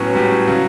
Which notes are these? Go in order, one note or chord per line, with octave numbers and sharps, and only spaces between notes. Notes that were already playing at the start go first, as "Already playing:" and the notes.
Already playing: A2 F#3 B3 C#4
A2 F#3 G3
C#3 F#3